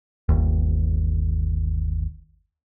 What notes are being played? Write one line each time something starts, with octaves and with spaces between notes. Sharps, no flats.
G1 D#2